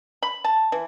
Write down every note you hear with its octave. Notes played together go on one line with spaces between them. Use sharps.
B5
A5
E3